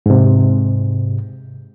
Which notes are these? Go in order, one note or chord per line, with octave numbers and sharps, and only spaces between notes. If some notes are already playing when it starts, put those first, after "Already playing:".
G#2 C3